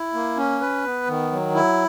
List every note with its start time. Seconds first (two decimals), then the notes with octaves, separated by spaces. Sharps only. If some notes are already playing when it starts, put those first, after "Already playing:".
Already playing: E4
0.14 A#3
0.37 C#4
0.61 B4
0.85 B3
1.08 D#3
1.32 F#3
1.55 E4